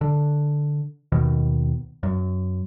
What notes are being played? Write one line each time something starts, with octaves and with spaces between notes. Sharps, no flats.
D3
D#2 B2 D#3
F#2